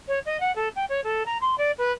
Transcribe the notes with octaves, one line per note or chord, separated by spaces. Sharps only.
C#5
D#5
F#5
A4
G5
C#5
A4
A#5
C6
D5
B4